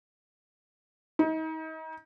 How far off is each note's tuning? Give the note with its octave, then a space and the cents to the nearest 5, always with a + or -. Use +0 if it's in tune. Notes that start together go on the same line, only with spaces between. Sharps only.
D#4 +35